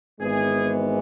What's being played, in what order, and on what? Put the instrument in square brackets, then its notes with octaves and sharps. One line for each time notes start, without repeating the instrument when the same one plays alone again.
[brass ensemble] G#1 G#2 E3 G#3 B3 G#4